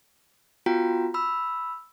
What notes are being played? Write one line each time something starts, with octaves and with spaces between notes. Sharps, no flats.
B3 F4 F#4 G5 A#5
B5 E6